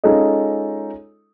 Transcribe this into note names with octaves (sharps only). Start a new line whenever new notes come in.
G#3 C#4 D#4 F4 A4 D#5